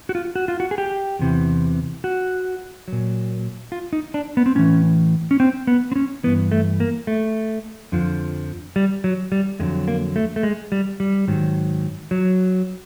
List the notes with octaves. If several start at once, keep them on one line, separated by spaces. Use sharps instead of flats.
F#4
F4
F#4
F4
F#4
G#4
G4
E2 C3 E3
F#4
A#2 F#3
F4
D#4
D4
B3
C4
A2 E3 C#4
C#4
C4
B3
C4
C#4
G2 E3 B3
A3
A#3
A3
F2 D3 F3
G3
F#3
G3
F2 D3 F#3 G#3
A#3
A3
A3
G#3
G3
G3
G#2 D#3 F#3
F#3